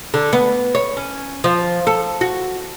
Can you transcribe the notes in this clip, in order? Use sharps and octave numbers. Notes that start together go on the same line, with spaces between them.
D3
B3
C#5
C#4
F3
A4
F#4